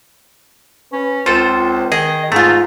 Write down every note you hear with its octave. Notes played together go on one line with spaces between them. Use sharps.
C#4 B4
C#2 C4 F4 A4 C5
D#3 G#4 D#5
G#2 G#3 A3 F4 A#5